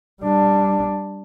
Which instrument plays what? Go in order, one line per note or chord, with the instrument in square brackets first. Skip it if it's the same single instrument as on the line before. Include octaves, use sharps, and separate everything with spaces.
[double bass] G3 D4